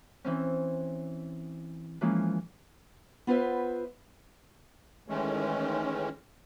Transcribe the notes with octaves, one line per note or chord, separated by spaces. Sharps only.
E3 C4 C#4
E3 F3 G#3 A#3 C#4 F4
B3 F4 B4 C5 E5
D#3 E3 G#3 A3 C#4